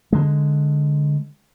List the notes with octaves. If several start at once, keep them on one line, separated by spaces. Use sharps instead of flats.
D3 G#3